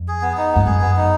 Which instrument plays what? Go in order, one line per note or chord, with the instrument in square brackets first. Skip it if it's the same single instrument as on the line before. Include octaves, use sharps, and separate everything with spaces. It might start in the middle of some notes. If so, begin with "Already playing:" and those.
Already playing: [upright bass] F2
[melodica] G#4
B3
D#4
[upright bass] G2 [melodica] B3
[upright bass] F#2 [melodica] G#4
[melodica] B3
D#4